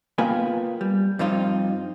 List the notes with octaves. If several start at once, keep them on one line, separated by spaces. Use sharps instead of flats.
A#3 B3 F4 B4 G5 G#5
G3
G2 F3 C4 D#4 F4